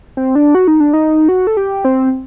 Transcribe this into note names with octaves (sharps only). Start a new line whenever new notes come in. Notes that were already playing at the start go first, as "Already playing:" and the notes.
C4
D4
F#4
D#4
D4
D#4
F#4
A4
G4
C4